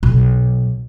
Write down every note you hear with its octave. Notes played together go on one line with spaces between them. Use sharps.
B1